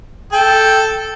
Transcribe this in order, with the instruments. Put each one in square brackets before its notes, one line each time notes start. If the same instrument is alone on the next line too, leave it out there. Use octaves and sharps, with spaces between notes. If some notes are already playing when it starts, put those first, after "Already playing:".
[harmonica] A4 [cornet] G5